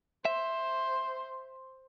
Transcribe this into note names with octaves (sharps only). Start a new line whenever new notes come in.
C5 E5